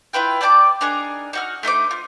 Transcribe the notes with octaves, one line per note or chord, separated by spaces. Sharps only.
E4 F4 B4 G5
D5 G5 A5 D6
D4 D#4 G#4 A#4
D#4 F#4 F6
A3 D#4 C5 D6
F4